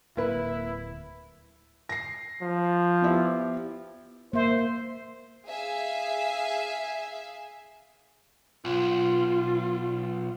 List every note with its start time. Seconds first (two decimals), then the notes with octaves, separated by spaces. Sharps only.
0.17 D1 A#3 E4 B4
1.89 A#6 C7
2.42 F3
3.02 B3 E4 G4
4.33 A#3 C5 E5
5.46 G#4 E5 F5 G#5
8.65 B1 F4